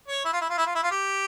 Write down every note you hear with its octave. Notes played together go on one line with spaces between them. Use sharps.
C#5
E4
F4
E4
F4
E4
F4
E4
F4
G4